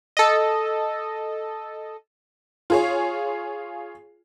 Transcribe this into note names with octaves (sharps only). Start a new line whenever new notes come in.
A4 D#5
F4 G#4 C#5